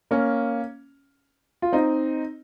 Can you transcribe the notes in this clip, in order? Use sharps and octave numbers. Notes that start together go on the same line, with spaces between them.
A#3 C#4
F4
C4 D#4